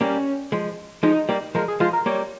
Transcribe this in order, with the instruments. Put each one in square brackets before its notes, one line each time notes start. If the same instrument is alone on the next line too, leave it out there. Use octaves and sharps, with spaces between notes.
[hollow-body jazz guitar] G3 A#3 [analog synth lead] C#4
[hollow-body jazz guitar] F3 G#3
[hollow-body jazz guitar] F3 G#3 [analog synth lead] D#4
[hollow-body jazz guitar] G3 A#3
[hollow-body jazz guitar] F3 G#3 [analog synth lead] A#4
[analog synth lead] G#4
[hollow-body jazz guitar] F3 G#3 [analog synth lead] F4
[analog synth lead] A#4
[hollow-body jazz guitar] G3 A#3 [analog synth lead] C#5